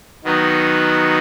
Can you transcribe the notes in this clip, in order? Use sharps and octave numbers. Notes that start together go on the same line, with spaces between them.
D#3 F#3 B3 D#4